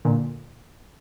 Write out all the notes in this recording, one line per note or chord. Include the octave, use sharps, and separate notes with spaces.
A#2 D3